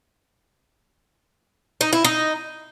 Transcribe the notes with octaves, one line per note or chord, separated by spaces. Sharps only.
D#4
E4
D#4